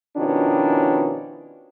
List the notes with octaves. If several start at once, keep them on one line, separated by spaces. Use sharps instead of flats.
B2 D#3 F3 C#4 D4 E4